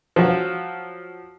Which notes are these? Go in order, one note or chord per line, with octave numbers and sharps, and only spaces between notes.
F3 F#3 F#4